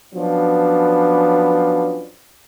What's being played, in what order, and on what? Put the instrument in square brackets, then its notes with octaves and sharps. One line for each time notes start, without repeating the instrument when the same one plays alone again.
[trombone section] F3 F#3 B3 C#4 D4